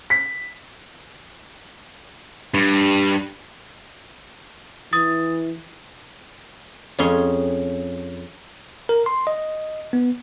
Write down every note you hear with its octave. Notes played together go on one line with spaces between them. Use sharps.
B6
G2
E3 D#6 A6
F2 C#4 G#4 C#5 C6
A#4
C6
D#5
B3